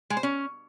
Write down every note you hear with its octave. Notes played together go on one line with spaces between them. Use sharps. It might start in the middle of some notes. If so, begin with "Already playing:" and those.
G#3
C5
C#4